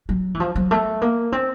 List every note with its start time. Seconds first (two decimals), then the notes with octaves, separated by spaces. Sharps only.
0.09 F#3
0.34 E3
0.40 F3
0.56 F#3
0.71 A3
1.02 A#3
1.32 C4